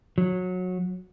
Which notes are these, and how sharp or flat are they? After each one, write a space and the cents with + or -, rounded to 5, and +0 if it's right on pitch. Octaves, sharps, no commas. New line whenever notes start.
F#3 -20